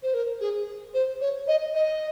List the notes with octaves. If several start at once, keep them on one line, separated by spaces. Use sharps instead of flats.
C5
A#4
G#4
C5
C#5
D#5
D#5